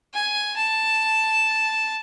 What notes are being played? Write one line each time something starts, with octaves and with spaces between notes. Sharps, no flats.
G#5
A5